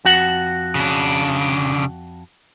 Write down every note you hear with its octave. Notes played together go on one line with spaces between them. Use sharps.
F2 F#4 F#5
C#3 D4